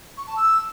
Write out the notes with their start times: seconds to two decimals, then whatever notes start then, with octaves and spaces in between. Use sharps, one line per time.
0.17 C#6
0.27 A5
0.37 E6